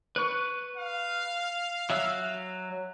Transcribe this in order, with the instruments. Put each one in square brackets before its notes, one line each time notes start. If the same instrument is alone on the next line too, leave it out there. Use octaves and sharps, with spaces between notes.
[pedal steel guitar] B4 C#6
[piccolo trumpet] F5
[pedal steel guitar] F#3 E5 E6